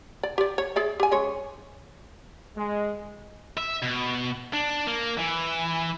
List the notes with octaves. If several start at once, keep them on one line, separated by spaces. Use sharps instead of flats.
D5
G4 D5
C#5
G#4 D5 E5
G4 G#5
C#3 G#3 C#5
G#3
E5
B2
D4
A#3
E3